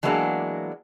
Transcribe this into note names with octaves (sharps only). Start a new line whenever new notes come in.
E3 F#3 G#3 A#3 B3 D4